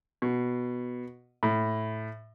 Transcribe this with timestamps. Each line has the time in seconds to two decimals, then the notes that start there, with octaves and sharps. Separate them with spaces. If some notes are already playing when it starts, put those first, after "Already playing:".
0.22 B2
1.43 A2